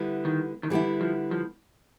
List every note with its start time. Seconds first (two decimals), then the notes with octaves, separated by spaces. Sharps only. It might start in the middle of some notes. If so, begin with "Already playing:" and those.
Already playing: D3 G3 B3 E4
0.25 D#3
0.63 D#3
0.70 D3 E3 G3 B3 E4
1.01 F3
1.31 F3